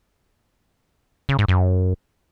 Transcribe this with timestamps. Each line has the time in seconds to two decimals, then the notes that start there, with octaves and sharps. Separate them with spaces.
1.29 C#3
1.39 G#2
1.48 F#2